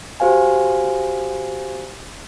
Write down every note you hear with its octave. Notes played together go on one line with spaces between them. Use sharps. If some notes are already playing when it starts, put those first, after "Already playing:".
F#4 G4 C5 F5 G#5